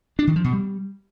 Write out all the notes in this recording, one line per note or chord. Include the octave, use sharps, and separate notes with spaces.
D4
D#3
F3
B2
G3